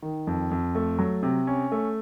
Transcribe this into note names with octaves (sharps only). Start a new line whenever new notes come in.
D#3
F2
F2
A3
F#3
C3
C#4
A3